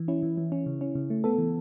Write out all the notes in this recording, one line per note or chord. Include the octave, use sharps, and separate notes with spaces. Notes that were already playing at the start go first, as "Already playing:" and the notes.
Already playing: E3
C#4 E4
E3
E3
C#4
C#3
C#4
C#3
A3
B3 A4
E3